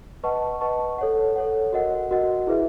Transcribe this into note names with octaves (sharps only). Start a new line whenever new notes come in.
B4 D#5 F#5 A5 C#6
B4 D#5 F#5 A5 C#6
A4 C#5 F#5
A4 C#5 F#5
F#4 A#4 D#5 F#5
F#4 A#4 D#5 F#5
E4 G#4 B4 E5